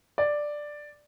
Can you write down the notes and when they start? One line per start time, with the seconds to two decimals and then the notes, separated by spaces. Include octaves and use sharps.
0.18 D5